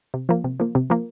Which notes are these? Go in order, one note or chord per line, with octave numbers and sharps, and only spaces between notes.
C3
F3 A#3
C3
F3 A#3
C3
F3 A#3